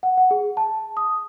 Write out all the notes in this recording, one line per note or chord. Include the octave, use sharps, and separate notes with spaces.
F#5
F#5
G#4
A5
D#6